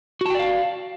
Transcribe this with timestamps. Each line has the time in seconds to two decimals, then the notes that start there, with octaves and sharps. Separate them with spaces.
0.21 F#4
0.26 A5
0.30 G5
0.35 D5
0.39 F5